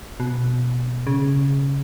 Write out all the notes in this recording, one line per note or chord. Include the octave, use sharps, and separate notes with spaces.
B2
C#3